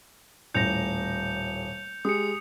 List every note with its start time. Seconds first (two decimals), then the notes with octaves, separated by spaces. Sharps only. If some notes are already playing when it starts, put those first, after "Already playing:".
0.54 D#1 A2 G6 A#6 C#7 F7
2.05 G#3 G4 D#6 C#7